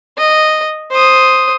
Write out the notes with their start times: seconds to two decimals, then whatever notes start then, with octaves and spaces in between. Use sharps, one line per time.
0.18 D#5
0.91 C5 D#6